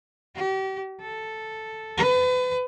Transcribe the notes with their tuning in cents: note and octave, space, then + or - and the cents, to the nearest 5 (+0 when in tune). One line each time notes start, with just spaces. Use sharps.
G4 -35
A4 +0
B4 +30